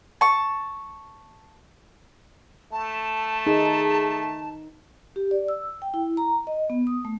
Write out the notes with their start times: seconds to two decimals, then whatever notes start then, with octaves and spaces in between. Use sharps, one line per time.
0.21 A5 C#6
2.72 A3 A5
3.47 D#4 G#4
5.16 G4
5.31 D5
5.48 E6
5.82 G5
5.94 E4
6.17 A#5
6.47 D#5
6.70 B3
6.87 D#6
7.05 A3